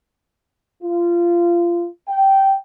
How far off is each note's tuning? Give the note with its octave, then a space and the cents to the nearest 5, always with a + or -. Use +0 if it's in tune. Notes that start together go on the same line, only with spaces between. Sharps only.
F4 -20
G5 -10